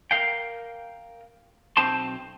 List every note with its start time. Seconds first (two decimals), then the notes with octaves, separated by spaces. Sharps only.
0.11 A#4 F5 G5
1.77 B1 C4 C5 A5 C6